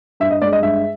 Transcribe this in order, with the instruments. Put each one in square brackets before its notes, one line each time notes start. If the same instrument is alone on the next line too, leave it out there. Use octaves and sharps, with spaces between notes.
[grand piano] G2 E5
D#5
G#3 D5
D#5
G2 E5